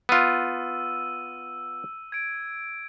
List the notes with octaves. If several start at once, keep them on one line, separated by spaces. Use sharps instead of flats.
B3 F4 E6 D#7
G#6 D7